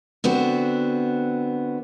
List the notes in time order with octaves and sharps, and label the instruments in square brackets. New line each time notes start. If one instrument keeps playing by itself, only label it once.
[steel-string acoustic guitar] D3 B3 C4 F#4